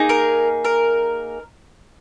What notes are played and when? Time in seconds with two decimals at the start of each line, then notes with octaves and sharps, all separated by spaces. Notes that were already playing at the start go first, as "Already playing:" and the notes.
Already playing: A#3 D#4 G#4
0.09 A#4
0.65 A#4